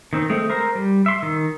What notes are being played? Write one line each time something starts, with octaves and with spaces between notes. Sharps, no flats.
D#3 C4 D#4
G#3 A3 C4
A#4 C5 A#5
G3
E5 C6
D#3